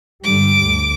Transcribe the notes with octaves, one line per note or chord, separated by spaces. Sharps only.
G2 D3 G3 D6
D2